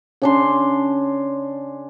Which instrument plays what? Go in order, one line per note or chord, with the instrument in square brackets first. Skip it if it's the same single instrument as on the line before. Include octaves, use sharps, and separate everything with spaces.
[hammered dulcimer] C#3 D4 C6